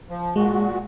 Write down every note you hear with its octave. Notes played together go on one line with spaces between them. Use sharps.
F3
A#2 G#3 F#4